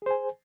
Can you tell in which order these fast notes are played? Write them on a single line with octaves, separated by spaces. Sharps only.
G#4 C5 G#5